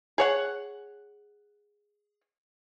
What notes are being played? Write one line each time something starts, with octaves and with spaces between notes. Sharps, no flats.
G#4 C#5 F#5